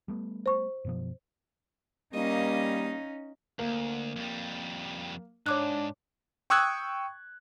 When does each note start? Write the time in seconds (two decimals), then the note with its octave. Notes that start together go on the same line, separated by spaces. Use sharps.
0.08 G3 A3 B3
0.46 C5 C#6
0.85 F#2 B2 F3
2.14 G3 A#3 C#4 D#4 D#5 F5
3.59 D2 A#3
4.16 F2 G3
5.46 G#2 D4 C#5 D6 F#6
6.50 G5 C#6 D#6 E6 F#6 G#6